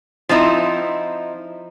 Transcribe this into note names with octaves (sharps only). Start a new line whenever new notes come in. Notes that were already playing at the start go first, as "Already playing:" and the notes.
F3 C4 D#4 E4